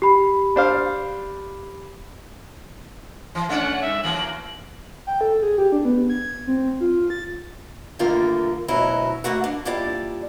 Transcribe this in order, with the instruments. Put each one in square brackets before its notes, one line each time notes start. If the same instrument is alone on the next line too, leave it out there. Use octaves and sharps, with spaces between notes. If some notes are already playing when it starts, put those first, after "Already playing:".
[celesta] G4 B5
[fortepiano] D4 C5 F5
[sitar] E3 [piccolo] C6
[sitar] A3 C#4 D4 [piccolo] F#5
[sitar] G2 [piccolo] E5
[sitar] E3 F#3 A#3 [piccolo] F#7
[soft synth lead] G5
A4
G#4
G4
D4
B3
G#6
C4
F4
A6
[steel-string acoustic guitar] G2 D3 D#3 A3 A#3 F4
D2 B2 F#3 C#4 D#4 E4
A3 A#3 F#4 F#5
D4
G3 A#3 E4 F4 D5 A5